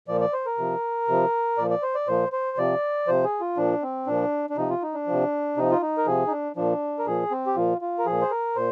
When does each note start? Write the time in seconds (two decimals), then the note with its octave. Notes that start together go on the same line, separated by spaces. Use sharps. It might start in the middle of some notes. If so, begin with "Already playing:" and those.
0.08 A#2 F3 D5
0.21 D5
0.33 C5
0.46 A#4
0.58 C3 F3
1.08 C3 F3
1.58 A#2 F3 D5
1.70 D5
1.83 C5
1.95 D5
2.08 A#2 F3 C5
2.32 C5
2.57 C3 F3 D5
3.07 C3 F3 C5
3.24 G#4
3.41 F4
3.57 A#2 F3 D4
3.82 C4
4.07 A#2 F3 D4
4.50 D4
4.57 C3 F3 D#4
4.70 F4
4.82 D#4
4.94 D4
5.07 C3 F3
5.57 C3 F3 D#4
5.71 F4
5.82 D#4
5.98 A#4
6.06 C3 F3 G#4
6.27 D#4
6.32 D4
6.56 A#2 F3 D4
6.99 A#4
7.06 A#2 F3 G#4
7.31 C4
7.46 G4
7.56 A#2 F3 F4
7.81 F4
7.98 A#4
8.06 A#2 F3 G#4
8.21 C5
8.31 A#4
8.56 A#2 C5